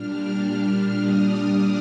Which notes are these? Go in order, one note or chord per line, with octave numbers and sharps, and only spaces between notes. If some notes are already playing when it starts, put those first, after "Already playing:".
Already playing: A#2 G3 D4 F6
D#6
D6